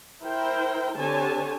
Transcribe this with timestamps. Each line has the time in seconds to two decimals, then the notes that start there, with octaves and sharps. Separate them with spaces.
0.22 E4 A#4 C5 G5
0.98 D3 C4 G4 C#5 G#5 A5